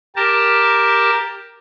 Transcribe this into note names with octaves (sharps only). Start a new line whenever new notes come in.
G4 A#4 A5